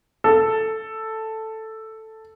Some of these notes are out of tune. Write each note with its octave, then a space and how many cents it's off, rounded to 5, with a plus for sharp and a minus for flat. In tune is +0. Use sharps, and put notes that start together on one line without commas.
A4 +5